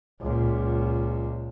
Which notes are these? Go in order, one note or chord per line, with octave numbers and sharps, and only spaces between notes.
C#2 A#2